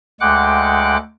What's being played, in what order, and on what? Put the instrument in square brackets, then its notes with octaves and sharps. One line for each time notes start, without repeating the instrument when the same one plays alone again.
[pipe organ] D2 G#3 F#5 G5 D6 F#6